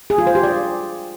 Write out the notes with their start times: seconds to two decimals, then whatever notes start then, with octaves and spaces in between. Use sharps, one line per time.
0.10 G#4
0.18 F4
0.27 C5
0.35 G4
0.43 D5